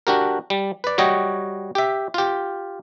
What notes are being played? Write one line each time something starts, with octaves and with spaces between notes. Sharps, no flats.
D4 F#4 G4 A#4
G3
B4 D5
G3 F#4 C#5 D#5 F#5 G5
G4 E5
F4 G4